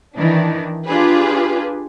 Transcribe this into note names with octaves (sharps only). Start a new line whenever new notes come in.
D#3 E3 D4
D4 F4 G4 G#4 B4